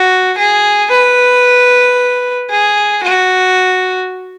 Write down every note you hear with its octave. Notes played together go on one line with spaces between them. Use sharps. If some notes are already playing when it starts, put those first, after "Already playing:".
Already playing: F#4
G#4
B4
G#4
F#4